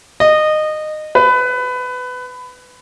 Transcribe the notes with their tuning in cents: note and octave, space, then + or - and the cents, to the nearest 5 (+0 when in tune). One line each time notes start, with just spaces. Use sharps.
D#5 -20
B4 +20